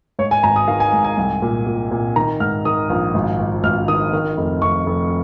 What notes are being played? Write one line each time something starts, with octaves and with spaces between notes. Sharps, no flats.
G#2 C#5
G#5
G#1 A#5
D#6
D#3 F5
G#5
G#2
G#5
C2
A#2
A#2
A#2
D#3 A#5
G#2 F6
D#3 D#6
A#1
G#1
G#1
G#1 F6
D#3 D#6
D#3
F1
F1 C#6
F1